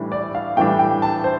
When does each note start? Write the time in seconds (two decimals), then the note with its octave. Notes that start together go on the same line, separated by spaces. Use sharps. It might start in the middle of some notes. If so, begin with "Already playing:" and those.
Already playing: A2 E3 G3 D4
0.12 D5
0.35 F5
0.57 A2 E3 G3 D4 G5
0.79 G5
1.02 A5
1.24 C5